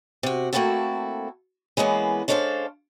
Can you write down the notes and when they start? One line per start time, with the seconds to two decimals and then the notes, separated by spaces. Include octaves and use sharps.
0.23 C3 F#4
0.53 A3 A#3 C4 E4 F#4 A4
1.77 E3 G#3 A#3 B3 C#4
2.28 G#3 C#4 D4 A4 C5 F5